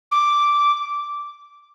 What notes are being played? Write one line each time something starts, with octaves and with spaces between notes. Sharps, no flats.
D6